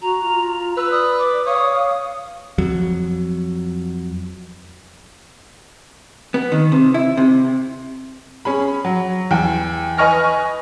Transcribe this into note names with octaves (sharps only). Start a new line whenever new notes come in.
F#4 A#5
F4
B4 E6
D5 D#6
D6
C#5 F5 D#6
F2 F#3
B3
D#3
C3
E4
C3
C#4 G#4 B5
F#3
E2 G5
B4 D#5 G#5 C#6 F6 A#6